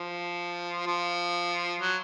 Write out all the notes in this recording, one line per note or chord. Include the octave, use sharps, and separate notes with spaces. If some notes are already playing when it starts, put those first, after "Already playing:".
Already playing: F3
F3
F#3